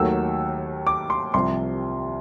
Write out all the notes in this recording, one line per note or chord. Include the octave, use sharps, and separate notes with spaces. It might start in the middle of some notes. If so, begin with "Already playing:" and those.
Already playing: D#2 D#3 F#3 A3 E6
D6
C6
C2 C3 F3 C6